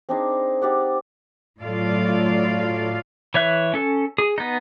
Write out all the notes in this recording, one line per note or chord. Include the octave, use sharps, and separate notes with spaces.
C4 D4 D#4 G#4
D#4 G4 D5 F#5
A2 F#3 F4 A4 D5 F5
E3 C#5 E5 F#6
C#4 A4
G#4
B3 D#4